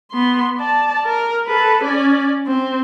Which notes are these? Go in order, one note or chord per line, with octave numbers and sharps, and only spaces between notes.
B3 C6
D5 A5
A#4
A4 B4
C#4 D5
C4